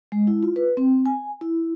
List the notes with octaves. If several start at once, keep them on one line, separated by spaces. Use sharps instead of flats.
G#3
E4
F4
B4
C4
G#5
E4